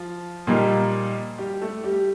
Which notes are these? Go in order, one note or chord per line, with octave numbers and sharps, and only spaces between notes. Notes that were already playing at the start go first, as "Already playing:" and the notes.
Already playing: F3 F4
A#2 G3 A#3 D#4 G4
G3 G4
A3 A4
G3 G4